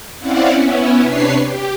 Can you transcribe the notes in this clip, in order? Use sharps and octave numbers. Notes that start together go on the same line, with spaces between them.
C4 C#4 E4 D5 F5 F#5
B3 C#4 E4
C3 D4 B4 C#5 C7
G4